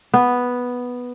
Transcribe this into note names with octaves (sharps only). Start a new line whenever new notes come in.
B3